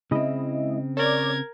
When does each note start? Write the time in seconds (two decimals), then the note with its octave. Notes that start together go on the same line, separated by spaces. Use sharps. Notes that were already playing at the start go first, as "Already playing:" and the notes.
0.11 C#3 G#3 C4 E4 D#5
0.97 A#4 C#5 D5 G#6